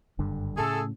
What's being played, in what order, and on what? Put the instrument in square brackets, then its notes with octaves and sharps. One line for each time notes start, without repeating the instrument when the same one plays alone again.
[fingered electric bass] F#1 G2 D3
[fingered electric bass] A2 C#3 [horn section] A3 G#4 A4